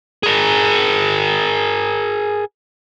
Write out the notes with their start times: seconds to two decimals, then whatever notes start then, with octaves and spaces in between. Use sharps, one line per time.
0.23 G#4 A#4